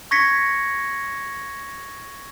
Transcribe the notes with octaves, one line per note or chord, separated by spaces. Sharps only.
C#6 G#6 A#6 B6 C#7